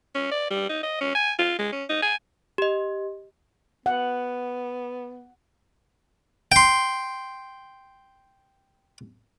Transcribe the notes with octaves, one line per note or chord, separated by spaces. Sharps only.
C#4
D5
G3
D#4
D#5
C#4
G#5
F4
G#3
C#4
D#4
G#5
G4 D#5
B3 F#5
G5 C6